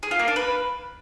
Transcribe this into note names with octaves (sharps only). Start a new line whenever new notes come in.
G#4
F4
A#3
D4
B4